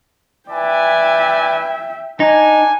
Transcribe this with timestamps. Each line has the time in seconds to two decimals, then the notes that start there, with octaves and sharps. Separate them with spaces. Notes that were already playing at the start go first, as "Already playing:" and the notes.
0.49 B4 D5 E5 G5 G#5
2.20 D4 D#4 G#5